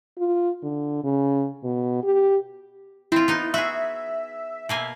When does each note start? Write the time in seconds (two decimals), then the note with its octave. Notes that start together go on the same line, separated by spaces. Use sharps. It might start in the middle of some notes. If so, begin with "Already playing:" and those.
0.18 F4
0.63 D3
1.04 C#3
1.64 B2
2.03 G4
3.12 C4 E4 F4
3.28 B3 D#4
3.54 F#4 G#4 E5
4.69 B2 A#3 G#5